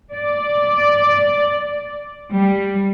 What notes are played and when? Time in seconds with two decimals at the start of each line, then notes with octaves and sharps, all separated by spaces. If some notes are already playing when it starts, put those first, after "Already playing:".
0.13 D5
2.33 G3